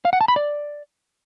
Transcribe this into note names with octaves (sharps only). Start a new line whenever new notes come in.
F5
F#5
A5
B5
D5